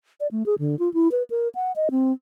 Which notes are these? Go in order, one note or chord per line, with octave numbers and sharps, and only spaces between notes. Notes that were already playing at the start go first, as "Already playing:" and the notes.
D5
A3
G#4
D3
F4
E4
B4
A#4
F#5
D#5
C4